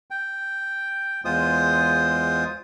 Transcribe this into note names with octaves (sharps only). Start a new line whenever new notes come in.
G5
E2 G#3 F4 C5 D#6